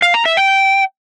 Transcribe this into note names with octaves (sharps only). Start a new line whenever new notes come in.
F5
A#5
E5
G5